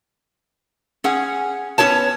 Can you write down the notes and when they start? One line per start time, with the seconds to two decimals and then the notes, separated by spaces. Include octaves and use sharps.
1.04 C#4 G#4 F#5
1.78 B3 C#4 G4 G#4 C#5 A5